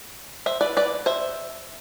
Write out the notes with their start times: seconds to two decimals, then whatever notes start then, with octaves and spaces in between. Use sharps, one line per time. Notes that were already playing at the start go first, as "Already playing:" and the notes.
0.46 C5 E5
0.61 B4 D5
0.77 B4 D5
1.06 C5 E5